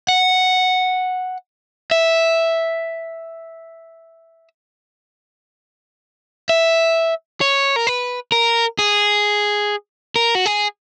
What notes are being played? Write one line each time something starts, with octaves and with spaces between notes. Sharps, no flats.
F#5
E5
E5
C#5
A#4
B4
A#4
G#4
A#4
F#4
G#4